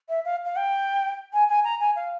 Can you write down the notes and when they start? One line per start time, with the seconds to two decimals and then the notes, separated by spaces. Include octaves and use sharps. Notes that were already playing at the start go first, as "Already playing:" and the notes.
0.09 E5
0.25 F5
0.45 F5
0.56 G5
1.33 G#5
1.49 G#5
1.64 A#5
1.80 G#5
1.96 F5